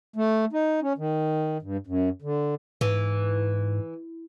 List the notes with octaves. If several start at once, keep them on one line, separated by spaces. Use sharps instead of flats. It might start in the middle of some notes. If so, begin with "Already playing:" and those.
A3
D#4
C#4
D#3
G2
F#2
D3
G#2 E3